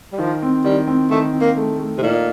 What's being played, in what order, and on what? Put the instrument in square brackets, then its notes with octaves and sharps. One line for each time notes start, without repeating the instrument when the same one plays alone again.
[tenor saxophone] G3
[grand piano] D#3 [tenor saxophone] F3
[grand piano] C4
[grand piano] D#3 [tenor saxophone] G3
[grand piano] C4
[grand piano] D#3 [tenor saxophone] A3
[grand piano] C4
[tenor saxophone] A#3
[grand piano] A3
A3
[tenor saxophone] C3
[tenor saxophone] A#2 [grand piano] D#4